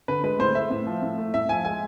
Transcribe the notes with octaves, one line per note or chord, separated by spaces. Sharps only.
D3 B4
G#3 B4
A2 C5
A3 E5
A2
F3
A2
A3
A2 E5
F3 G#5
G#3 G#5